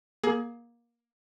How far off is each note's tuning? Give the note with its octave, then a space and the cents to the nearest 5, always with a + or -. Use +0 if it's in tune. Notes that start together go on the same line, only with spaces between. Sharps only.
A#3 +20 G#4 +30